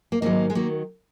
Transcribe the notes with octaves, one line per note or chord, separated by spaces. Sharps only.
A#3
G#2 D#3 F#3 A#3
G#3
D#3 F#3 A#3